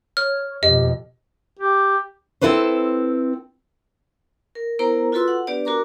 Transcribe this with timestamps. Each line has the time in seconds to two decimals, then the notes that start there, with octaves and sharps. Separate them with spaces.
0.17 C#5 F6
0.63 F2 B2 G4 D#5
1.59 G4
2.41 C4 E4 A4 B4 C5
4.55 A#4
4.79 B3 E4 A#4 C5 A#5
5.12 F4 F#4 A4 B4 C6 E6
5.28 F#5
5.47 B3 D4 G4 B4 D5
5.65 F#4 A#4 A#5 D6